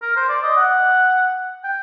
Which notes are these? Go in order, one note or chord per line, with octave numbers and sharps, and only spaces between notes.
A#4
C5
D5
D#5
F#5
G5